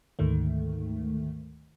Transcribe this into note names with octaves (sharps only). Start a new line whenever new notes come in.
D2 G#2 D#3 A3